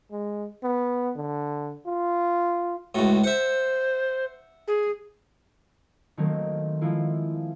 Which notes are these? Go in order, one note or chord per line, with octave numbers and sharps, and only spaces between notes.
G#3
B3
D3
F4
C#2 A2 F#4
C5 E5 F#5
G#4
D#3 F#3 A3 A#3 C4 D#4
F3 G#3 A#3 E4 F4